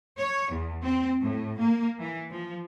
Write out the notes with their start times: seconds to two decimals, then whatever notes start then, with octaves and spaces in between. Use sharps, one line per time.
0.18 C#5
0.52 E2
0.84 C4
1.21 A2
1.60 A#3
1.99 E3
2.31 F3